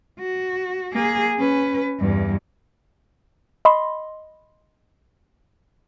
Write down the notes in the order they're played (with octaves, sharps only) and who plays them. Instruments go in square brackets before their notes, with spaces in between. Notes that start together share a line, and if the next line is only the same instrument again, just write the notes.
[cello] F#4
A#3 G#4
C#4 B4
E2 G2
[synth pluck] D#5 B5 C6